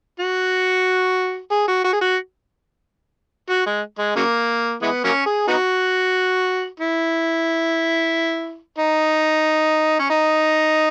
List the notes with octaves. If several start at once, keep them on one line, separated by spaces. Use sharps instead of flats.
F#4
G#4
F#4
F#4
G#4
F#4
F#4
G#3
G#3
C#3 F#3 A#3
E3 G#3 B3
F#3 A#3 C#4
G#4
B3 D#4 F#4
E4
D#4
C#4
D#4